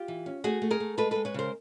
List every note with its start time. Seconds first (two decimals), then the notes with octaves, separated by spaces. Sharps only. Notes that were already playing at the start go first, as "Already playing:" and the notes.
Already playing: F4 G4
0.08 E3
0.26 C#4
0.44 A3 F#4 G#4
0.62 A3
0.70 G#4 A#4
0.80 A3
0.97 G#3 A4 B4
1.11 G#3 A4 B4
1.25 B4 C#5
1.34 C#3 A#4 C5